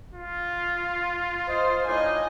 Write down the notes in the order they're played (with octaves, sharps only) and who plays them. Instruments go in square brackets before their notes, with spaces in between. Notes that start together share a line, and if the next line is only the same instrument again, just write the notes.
[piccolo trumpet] F4
[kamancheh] C5 [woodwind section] D#5 C6
[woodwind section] A2 D4 D#4 [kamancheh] D#5 G#5